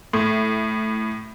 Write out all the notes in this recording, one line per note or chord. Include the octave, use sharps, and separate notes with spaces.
A2